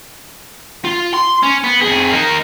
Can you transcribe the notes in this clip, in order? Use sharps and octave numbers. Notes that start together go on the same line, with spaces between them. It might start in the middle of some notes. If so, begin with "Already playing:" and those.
F4
C6
C#4
B3
F2 G#4
A#3 D#4